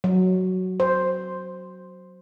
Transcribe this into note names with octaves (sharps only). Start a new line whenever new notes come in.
F#3
C5